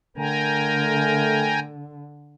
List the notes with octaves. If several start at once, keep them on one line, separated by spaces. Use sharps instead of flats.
D3 A3 A#4 G5 G#5 A#5